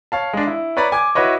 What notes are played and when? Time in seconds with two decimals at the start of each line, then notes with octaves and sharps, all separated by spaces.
0.12 C#5 F5 A5
0.33 G#3 D4
0.47 E4
0.77 B4 C#5 D5 A#5 B5
0.92 G#5 D6 G#6
1.15 E4 F#4 B4 C#5 D#5